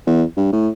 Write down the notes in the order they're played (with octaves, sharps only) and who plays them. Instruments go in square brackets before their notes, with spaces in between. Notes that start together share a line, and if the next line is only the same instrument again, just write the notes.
[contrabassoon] E2
G2
A2